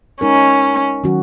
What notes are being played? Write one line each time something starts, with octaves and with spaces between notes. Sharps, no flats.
G#3 C#4 D#4 A#4
D#3 F#3 C#4 F#4